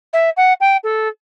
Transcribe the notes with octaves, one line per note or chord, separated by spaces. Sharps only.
E5
F#5
G5
A4